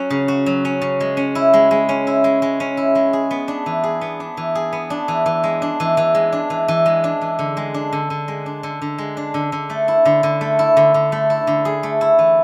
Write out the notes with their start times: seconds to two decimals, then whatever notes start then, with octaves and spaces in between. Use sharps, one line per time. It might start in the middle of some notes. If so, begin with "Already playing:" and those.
Already playing: F#3 C#4 F#4
0.10 C#3
0.28 F#4
0.46 F#3
0.65 C#4
0.82 C#3
1.00 G#3
1.17 C#4
1.35 E4
1.53 G#3
1.71 G#3
1.89 C#4
2.07 E4
2.24 G#3
2.42 G#3
2.60 C#4
2.77 E4
2.95 G#3
3.13 G#4
3.31 B3
3.48 D4
3.66 E3
3.83 G#4
4.01 B3
4.20 D4
4.37 E3
4.55 G#4
4.73 B3
4.90 D4
5.08 E3
5.26 E3
5.44 G#3
5.62 D4
5.80 E3
5.97 E3
6.15 G#3
6.32 D4
6.50 E3
6.68 E3
6.86 G#3
7.04 D4
7.21 E3
7.39 D3
7.57 G#3
7.74 D4
7.93 D3
8.10 D3
8.28 G#3
8.46 D4
8.63 D3
8.82 D3
8.98 G#3
9.17 D4
9.34 D3
9.52 D3
9.70 A3
9.88 E4
10.05 D3
10.23 D3
10.41 A3
10.59 E4
10.77 D3
10.94 D3
11.12 A3
11.30 E4
11.47 D3
11.65 G#4
11.83 A3
12.01 E4
12.19 E3